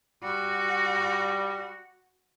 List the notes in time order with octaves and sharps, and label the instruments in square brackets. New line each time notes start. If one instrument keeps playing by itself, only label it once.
[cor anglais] G3 [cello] F#4